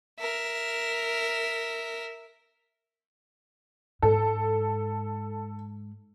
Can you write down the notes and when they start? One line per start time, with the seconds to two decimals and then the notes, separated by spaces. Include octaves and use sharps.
0.20 A#4 E5
4.02 G#2 A4